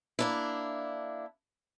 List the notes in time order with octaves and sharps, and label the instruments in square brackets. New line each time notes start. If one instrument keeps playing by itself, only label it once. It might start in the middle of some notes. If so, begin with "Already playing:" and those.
[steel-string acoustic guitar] A#3 D4 E4